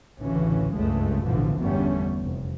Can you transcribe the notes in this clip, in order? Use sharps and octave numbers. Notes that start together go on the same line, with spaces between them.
A1 D2 C#3 E3 C#4
F#1 C#2 G2 C#3 G#3 A3
A1 G2 B2 D3 E3 F3
G1 E2 D3 G3 A3 C#4
F1